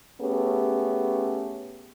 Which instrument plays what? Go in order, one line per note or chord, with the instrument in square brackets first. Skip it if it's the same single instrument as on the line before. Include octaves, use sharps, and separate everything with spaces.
[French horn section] A3 B3 C#4 G4 G#4